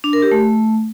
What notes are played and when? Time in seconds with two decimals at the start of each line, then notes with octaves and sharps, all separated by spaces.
0.04 D4
0.13 A#4
0.22 G4
0.32 A3